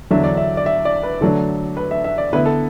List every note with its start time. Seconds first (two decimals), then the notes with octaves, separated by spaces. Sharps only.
0.11 E2 D3 F#3 D4 E5
0.24 D5
0.37 E5
0.57 D5
0.66 E5
0.85 D5
1.03 B4
1.21 D3 F#3 A3 D4 A4
1.77 B4
1.91 E5
2.04 E5
2.18 D5
2.33 D3 B3 E4 B4
2.46 A4